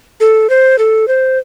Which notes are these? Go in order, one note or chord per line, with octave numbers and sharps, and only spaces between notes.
A4
C5
A4
C5